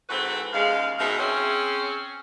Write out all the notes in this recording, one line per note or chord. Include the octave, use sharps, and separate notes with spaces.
G#2 E3 C4 F#4 A4 B4
D#2 C#3 G#3 F5
G#2 B2 D#3 G#3 E5 F5
C4 C#4 G#4